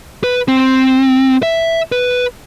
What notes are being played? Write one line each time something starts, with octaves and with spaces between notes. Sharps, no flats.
B4
C4
E5
B4